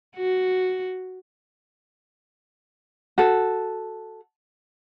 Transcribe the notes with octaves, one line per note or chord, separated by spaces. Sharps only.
F#4
F#4 A4